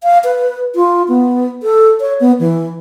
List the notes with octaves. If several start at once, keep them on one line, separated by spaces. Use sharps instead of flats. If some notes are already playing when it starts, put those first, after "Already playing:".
F5
B4
F4
B3
A4
C#5
B3
E3